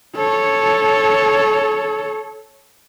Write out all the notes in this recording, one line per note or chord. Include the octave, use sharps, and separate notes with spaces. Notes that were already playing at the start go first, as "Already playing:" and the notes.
A4 C#5